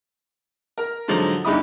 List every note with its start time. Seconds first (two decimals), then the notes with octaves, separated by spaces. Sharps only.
0.78 A#4 A#5
1.08 G#2 D3 F3 F#3
1.45 G1 G2 D#4 E4 B5 D#6